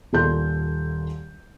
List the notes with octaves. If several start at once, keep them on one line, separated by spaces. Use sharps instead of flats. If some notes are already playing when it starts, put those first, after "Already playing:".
D#1 A#2 A4 C6 G6